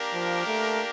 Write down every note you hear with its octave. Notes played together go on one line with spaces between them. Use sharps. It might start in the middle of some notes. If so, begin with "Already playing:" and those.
Already playing: A#3 D4 G4 A#4
F3
A3